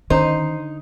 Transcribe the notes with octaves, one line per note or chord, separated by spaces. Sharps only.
D3 D#3 C#4 D#4 C5